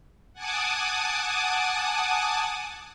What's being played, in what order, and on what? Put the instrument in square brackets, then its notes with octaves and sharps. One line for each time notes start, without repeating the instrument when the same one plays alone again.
[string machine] F#5 G#5 A5 D6 D#6